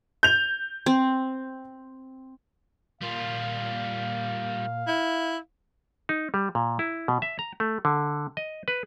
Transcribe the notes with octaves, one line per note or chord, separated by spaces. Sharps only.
G6 F7
C4
A#2 G3 F4 F5
E4
D#4
G3
A#2
E4
B2
E5
A#5
A3
D3
D#5
B4